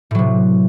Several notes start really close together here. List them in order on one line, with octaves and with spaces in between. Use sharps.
A2 F#3 C3